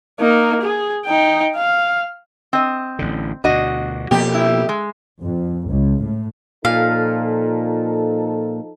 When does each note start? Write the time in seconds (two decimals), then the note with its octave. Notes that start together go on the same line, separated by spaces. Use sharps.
0.20 A#3 D#4
0.61 G#4
1.05 D#4 G5
1.56 F5
2.53 C4 D#5
2.99 A1 D3
3.44 D2 B2 D4 F#4 D#5
4.11 F2 B2 A#3 B3 G4
4.34 E4
4.69 G#3
5.22 F2
5.69 C#2
6.01 A2
6.65 A#2 F3 D#4 A4 F5